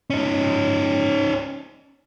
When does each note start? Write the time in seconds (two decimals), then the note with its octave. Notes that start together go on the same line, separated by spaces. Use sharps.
0.10 C#4 D#4